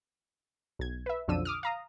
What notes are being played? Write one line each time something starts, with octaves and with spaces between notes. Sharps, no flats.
B1 G#6
B4 E5
B1 F2 D3 F3 E6 D#7
D6 D#6 F6
F5 A#5 D#6